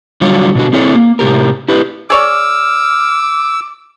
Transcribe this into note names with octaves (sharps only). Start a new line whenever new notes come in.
D3 F#3 G3 F4 F#4 C#5
B2 D3 F#4
C4 E4 G#4 A4 C#5
A#3
A2 C3 G4 A#4
E4 G4 B4
G#4 C#5 D5 D6 E6 F6